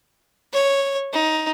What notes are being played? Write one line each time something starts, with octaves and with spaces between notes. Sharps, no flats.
C#5
D#4